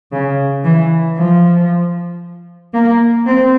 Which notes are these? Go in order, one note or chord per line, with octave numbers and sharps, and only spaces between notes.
C#3
E3
F3
A#3
C4